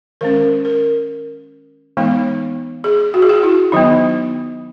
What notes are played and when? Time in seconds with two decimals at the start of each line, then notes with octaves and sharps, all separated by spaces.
0.21 D#3 G#3 C#4 A#4
0.65 A#4
1.97 E3 G#3 B3 D#4
2.84 G#4
3.14 F#4
3.22 G#4
3.29 F#4
3.43 E4
3.72 D#3 F#3 B3 D#4